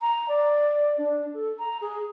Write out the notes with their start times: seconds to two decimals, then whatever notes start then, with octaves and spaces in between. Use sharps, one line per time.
0.01 A#5
0.28 D5
0.98 D4
1.34 A4
1.59 A#5
1.81 G#4